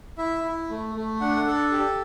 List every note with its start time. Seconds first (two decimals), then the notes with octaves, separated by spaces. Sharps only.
0.18 E4 E5
0.44 E4
0.70 A3
0.95 A3
1.20 D4 F#5
1.46 A4
1.72 G4